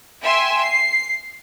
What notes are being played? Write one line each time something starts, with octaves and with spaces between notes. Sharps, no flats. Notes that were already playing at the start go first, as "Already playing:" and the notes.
E5 G5 G#5 C6 E6
C7